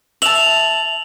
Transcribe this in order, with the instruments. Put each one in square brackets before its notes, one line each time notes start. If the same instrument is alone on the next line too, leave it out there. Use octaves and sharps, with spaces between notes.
[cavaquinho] E5 A5 [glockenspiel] F7 F#7